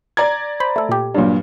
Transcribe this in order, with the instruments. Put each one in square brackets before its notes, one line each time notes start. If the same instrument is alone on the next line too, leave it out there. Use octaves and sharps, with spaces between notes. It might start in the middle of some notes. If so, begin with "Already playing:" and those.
[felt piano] D5 A#5 G#6
[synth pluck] C5 B5
A3 A4
A#2 G4
[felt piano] G2 A#2 [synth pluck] F#3 G3